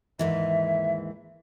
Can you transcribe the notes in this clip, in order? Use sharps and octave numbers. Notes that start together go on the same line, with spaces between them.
D#2 G#2 E3 E5